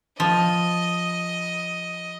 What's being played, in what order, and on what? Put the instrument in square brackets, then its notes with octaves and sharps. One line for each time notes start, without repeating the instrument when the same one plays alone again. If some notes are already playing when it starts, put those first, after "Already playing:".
[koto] F3 [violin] D#5